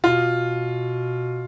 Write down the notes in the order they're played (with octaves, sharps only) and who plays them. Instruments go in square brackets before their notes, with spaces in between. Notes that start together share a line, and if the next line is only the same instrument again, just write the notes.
[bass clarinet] B2 [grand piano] F4